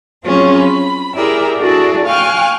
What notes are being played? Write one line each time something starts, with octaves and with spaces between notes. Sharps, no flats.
F#3 C4 C#4 F4 G#4 C#5
B5
E4 G4 G#4 A#4 D5 E5
D4 E4 F#4 G#4 A4 D5
F5 G5 G#5 C#6 F6 F#6